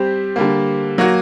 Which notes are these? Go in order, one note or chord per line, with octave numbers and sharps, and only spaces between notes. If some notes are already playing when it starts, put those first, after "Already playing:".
Already playing: G3 C4 G4 C5
D3 G3 A#3
F#3 A#3 F#4